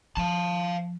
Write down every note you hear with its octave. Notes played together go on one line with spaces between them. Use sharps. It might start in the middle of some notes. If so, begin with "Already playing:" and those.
F3 F5 A5